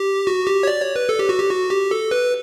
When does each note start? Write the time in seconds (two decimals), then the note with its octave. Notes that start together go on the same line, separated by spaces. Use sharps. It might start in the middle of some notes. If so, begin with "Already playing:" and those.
Already playing: G4
0.27 F#4
0.47 G4
0.63 C#5
0.67 D5
0.81 C#5
0.96 B4
1.09 A4
1.19 G4
1.29 F#4
1.39 G4
1.50 F#4
1.70 G4
1.91 A4
2.11 B4